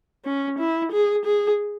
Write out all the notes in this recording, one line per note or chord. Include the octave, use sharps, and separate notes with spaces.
C#4
E4
G#4
G#4